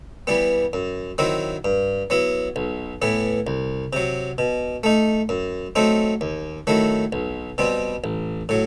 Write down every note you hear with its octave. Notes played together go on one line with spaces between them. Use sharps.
E3 G3 B3
F#2
D#3 F#3 C4 E4
G2
F#3 B3 E4
B1
A2 E3 B3
C2
C3 F#3
B2
A3 D#4
F#2
F#3 A3 C4 D#4
D#2
D#3 F#3 A3 E4
B1
B2 G3 C4
A1
A2 F#3